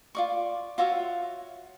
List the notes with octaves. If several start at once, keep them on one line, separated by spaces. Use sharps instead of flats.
F4 D5 C#6
F4 F#4 C#5 E5